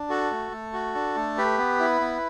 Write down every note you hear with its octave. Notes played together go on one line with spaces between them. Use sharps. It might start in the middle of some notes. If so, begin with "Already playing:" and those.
Already playing: D4
F#4 A4
A3
A3
F#4
D4
A3
G4 B4
B3
E4
B3